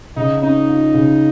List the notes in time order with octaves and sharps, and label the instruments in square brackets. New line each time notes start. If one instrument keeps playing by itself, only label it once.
[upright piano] C#3 [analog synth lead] D#4
[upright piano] C#4 [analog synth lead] D#4
[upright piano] F4
C#3